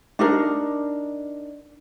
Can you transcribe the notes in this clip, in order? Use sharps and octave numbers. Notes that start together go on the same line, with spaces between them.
D4 D#4 A#4